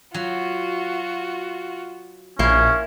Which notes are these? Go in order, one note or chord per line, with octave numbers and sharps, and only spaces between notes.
F#3 F4 F#4
A#1 A#3 C#4 E4 C6